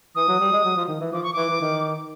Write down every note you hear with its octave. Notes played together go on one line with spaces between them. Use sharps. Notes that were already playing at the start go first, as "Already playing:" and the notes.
E3 D#6
F#3
G3
G#3
F#3
F3
D#3
E3
F3 D6
C#6
E3 D6
E3
D#3